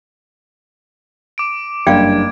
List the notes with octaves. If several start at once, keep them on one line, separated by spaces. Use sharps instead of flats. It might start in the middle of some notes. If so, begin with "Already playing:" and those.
D6 D7
F#1 G2 D5 F5 G5 G#6